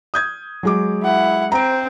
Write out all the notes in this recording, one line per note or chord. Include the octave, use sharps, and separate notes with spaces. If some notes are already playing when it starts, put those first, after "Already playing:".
D#6 G6 G#6
F#3 G#3 D6
E4 F#5
C4 C5 A#5 D7